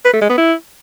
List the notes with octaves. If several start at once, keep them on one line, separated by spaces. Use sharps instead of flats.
B4
A3
G#3
B3
E4